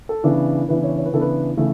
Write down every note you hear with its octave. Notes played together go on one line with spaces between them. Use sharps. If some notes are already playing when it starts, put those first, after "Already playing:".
A4
C#3 E3 B3 D4
C#3 E3 B3 D4 B4
C#5
C#5
B4
C#3 E3 B3 D4 A4
B4
C#3 E3 A3